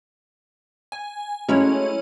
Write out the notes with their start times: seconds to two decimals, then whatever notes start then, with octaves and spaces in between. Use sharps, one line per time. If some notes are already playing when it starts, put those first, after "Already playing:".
0.92 G#5
1.49 F#3 G#3 A3 C#4 E4 C#5